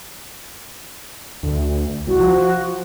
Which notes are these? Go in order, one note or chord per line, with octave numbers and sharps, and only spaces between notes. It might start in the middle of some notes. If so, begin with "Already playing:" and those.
D2
C2 F#4
F3